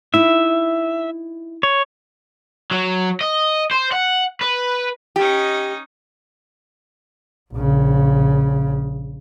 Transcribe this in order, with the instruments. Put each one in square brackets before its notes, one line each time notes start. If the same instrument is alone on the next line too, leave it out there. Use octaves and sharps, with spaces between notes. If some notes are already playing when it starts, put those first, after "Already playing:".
[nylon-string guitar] D#4 E4 [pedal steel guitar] E5
[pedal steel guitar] C#5
[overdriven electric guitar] F#3
D#5
C5
F#5
B4
[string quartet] C#4 D#4 D#5 [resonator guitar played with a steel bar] G4
[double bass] A#1 C#3